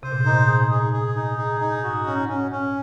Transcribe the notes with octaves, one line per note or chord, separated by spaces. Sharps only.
C3 C5
A#2
G#2
A#2 D#4
G#4
G#4
G#4
D#4
G#4
D#4
G#2 F#4
C#4
C#4
C#4